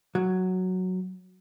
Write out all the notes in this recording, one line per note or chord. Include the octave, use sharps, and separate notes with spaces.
F#3